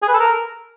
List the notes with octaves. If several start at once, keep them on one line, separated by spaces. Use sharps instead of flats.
G#4
B4
A4
A#4